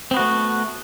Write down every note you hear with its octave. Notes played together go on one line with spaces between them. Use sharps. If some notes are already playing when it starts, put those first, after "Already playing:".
A3 B3 C4 F#4